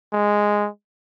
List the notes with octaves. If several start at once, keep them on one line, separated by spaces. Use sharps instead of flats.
G#3